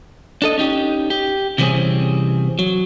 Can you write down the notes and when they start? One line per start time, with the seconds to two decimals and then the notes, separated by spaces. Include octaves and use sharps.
0.42 D4 A4 D#5
0.58 C#4 D#4 G4
1.10 G4
1.58 C3 E3 G3 C4 C#4 G#4
2.59 F#3